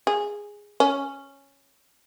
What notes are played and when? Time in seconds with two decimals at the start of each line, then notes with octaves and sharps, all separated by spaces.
0.07 G#4
0.80 C#4